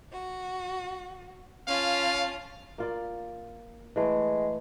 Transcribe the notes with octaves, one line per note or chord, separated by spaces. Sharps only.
F#4
C#4 F4 F5 A5
A#3 F4 D5
E3 G#3 A3